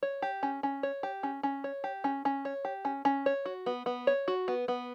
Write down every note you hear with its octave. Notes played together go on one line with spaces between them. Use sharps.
C#5
G4
C#4
C#4
C#5
G4
C#4
C#4
C#5
G4
C#4
C#4
C#5
G4
C#4
C#4
C#5
F#4
B3
B3
C#5
F#4
B3
B3